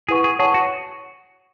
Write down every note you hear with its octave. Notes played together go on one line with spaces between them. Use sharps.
E4 G#4 B4 F#5 C#6
G#4
G#4 C#5 F#5 A5 C#6
F#4